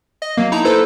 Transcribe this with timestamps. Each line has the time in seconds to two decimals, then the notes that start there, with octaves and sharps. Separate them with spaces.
0.22 D#5
0.37 F#3 A#3
0.52 D#4 E4 A5 A#5
0.65 E4 A4 B4 C5